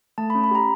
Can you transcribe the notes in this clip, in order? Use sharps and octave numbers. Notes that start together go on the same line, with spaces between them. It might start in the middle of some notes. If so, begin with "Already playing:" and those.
A3 A5
B5
C#4
B5
G4 A#5